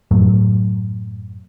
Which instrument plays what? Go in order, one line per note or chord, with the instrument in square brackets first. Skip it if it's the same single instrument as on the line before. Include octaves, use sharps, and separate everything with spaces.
[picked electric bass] F#2 A2 F#3 A3